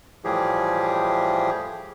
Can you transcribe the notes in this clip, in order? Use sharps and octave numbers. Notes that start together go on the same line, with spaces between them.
A2 E3 F3 G3 G4 G#4